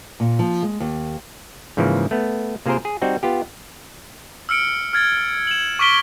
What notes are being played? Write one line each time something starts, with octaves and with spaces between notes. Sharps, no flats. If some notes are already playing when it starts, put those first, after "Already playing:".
A#2
F3
G#3
D#2
G#2 C#3 E3 F3 A#3
A3 B3
C3 A#3 F4 G#4 A#4 C5
G#4
G3 C4 D#4 F#4
B3 F4 G4
E6 F6 C#7 D7
F6 G#6 A6
E7 F#7
C#6 D6 F6 B6 D7 G7